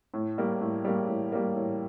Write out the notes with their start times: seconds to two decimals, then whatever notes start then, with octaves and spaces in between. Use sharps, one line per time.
0.14 A2
0.38 G3 A#3
0.61 A2
0.85 G3 A#3
1.08 A2
1.32 G3 A#3
1.56 A2